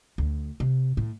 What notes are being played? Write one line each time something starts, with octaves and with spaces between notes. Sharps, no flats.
D2
C3
A2